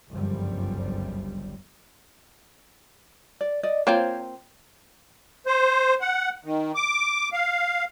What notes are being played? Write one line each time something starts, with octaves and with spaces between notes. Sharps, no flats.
G1 C#2 F#2 F3 G3
D5
D5 D#5
A#3 C4 F4 C5 C#5 A#5
C5
F#5
D#3
D6
F5